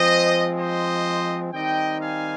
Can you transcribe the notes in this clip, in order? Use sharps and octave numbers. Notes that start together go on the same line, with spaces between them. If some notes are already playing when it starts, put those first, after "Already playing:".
Already playing: F3 G#3 C4 C5 D#5
C5 D#5
D#3 G3 C4 D#4 D#5 G5
F5 G#5